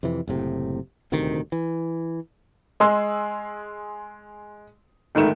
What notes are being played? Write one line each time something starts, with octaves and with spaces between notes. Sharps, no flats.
F2 C3 E3
F#1 A2 C3
D#1 D2 C3 D#3
E3
G#3 G#4 C6 E6
G1 G#2 D#3 A3 E7